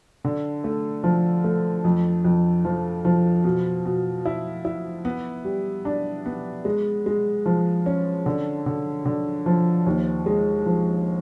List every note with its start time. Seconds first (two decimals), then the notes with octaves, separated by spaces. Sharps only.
0.24 D3
0.64 A3
1.04 F3
1.44 A3
1.84 F2
2.25 F2
2.65 F3
3.05 F3
3.44 B2
3.85 B2
4.25 E4
4.65 E4
5.05 B3
5.45 G3
5.85 D4
6.26 B3
6.65 G#3
7.06 G#3
7.46 F3
7.86 C#4
8.26 D3
8.66 D3
9.05 D3
9.46 F3
9.86 D#2
10.26 G#3
10.66 F3